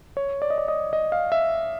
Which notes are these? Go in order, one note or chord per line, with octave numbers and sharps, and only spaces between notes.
C#5
D5
D#5
D5
D#5
D#5
F5
E5